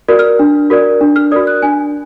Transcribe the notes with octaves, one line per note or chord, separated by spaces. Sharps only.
F#4 A#4 D5
F6
D4
F#4 A#4 D5
D4
F6
F#4 A#4 D5 D#6
F#6
D4 G#5